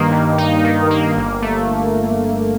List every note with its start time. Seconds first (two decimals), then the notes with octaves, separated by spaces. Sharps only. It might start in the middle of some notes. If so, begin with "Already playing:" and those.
Already playing: G2 D#3 A#3 D#4
0.12 G2
0.38 D#4
0.64 D#3
0.91 A#3
1.16 G1
1.42 A3